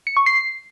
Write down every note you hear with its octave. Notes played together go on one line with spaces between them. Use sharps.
C#7
C#6
C7